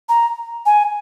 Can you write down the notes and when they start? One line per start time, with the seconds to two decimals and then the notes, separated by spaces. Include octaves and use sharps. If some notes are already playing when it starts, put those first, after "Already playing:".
0.09 A#5
0.66 G#5